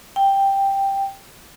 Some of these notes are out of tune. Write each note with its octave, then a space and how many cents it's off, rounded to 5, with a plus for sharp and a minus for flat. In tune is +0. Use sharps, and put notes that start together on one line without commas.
G5 +5